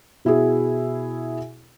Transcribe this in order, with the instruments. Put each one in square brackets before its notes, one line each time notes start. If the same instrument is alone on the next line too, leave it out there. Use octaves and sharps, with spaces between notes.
[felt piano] B2 E4 F#4 G#4